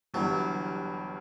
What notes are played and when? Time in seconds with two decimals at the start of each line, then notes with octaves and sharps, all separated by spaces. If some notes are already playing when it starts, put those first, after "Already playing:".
0.14 G1 G2 E3 F#3 G3